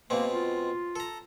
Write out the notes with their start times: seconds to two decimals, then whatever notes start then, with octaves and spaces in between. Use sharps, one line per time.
0.10 B2 G#3 A#3 C4
0.32 F4
0.96 A4 A#5